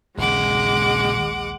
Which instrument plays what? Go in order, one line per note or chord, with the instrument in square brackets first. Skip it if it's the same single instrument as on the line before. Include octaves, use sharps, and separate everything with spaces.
[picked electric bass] A#1 D#2 [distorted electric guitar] A#2 C#3 [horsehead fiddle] G#3 [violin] F#5 D6